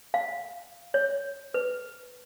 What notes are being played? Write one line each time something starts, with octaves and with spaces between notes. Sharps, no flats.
F5
C#5
B4